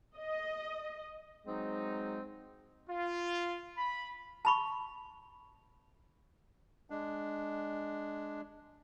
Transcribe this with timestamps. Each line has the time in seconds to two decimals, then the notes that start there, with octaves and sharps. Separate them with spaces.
0.16 D#5
1.46 F#3 G#3 C4 D#4
2.89 F4
3.76 B5
4.45 A5 B5 C#6
6.90 G#3 D4